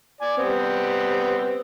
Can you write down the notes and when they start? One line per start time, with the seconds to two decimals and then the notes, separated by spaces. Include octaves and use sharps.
0.21 D5 G#5
0.37 G3 B3 C4